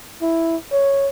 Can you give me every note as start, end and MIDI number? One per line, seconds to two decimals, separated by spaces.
0.22 0.57 64
0.72 1.09 73